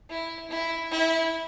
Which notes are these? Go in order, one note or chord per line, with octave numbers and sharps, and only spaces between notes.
E4
E4
E4